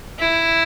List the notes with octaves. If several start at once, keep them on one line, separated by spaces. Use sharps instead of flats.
E4